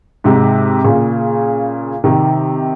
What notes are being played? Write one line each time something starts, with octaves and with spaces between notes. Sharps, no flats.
G#2 C3
A#2 C#3
C3 D#3